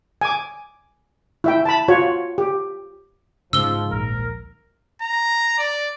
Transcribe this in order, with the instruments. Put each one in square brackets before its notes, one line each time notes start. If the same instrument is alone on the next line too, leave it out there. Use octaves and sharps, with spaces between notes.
[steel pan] G#5 D6
E4 E5 G5
A5 B5
F4 F#4 C#5
G4
[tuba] G#2 [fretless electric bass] C#3 C#4 [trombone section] F3 [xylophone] E6 G7
[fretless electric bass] D#1 A#1 [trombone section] A#4
[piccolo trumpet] A#5
D5